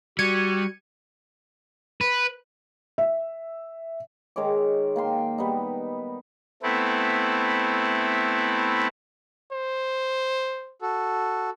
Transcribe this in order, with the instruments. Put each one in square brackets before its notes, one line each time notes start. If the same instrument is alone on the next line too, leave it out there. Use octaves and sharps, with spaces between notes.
[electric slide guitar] G3 [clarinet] F#4 [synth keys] G#6 C#7 D#7
[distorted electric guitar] B4
[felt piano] E5
[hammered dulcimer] D#3 G#3 C#5 D6
A#3 G5 C6
G3 B3 D#4
[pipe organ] A3 B3 C4 E4
[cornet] C5
[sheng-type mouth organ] F#4 A4